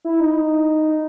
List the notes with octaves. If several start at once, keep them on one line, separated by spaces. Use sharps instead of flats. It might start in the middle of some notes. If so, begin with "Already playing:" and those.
E4
D#4